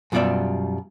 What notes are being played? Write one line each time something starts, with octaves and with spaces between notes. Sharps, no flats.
F#2 B2 G3 F4 D5 E5